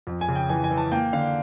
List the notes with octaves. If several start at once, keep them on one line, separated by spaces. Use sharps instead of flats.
F2
G#5
C#3
G5
E3 G#5
G#5
E3
A5
A#3 G5
D3 F5